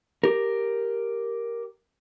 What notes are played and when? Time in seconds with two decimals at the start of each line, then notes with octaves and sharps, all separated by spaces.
0.24 G4 A#4